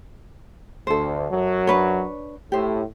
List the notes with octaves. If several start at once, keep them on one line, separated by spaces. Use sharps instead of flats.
D2 A4 C5
F#2 F#3
D4 B4 C#5
A2 G4 C5